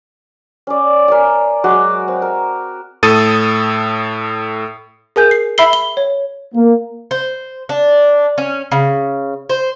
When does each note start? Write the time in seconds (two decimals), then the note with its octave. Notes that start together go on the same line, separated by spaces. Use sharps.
0.67 C#4 D5
1.08 A#4 D5 G#5
1.64 F#3 G#3 F#4 D6
2.08 C4
2.22 A#4
3.03 A2 A4 D#6 A6 D#7
5.16 G#4 A#4 G#5 G6
5.31 C7
5.58 E5 B5 E6 C7 G7
5.73 G7
5.97 C#5
6.54 A#3
7.11 C5
7.69 D4
8.38 C#4
8.72 C#3
9.49 C5